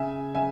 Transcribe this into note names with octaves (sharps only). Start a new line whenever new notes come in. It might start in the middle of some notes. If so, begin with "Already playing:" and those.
Already playing: C#3 E5 G#5
C#3 E5 G#5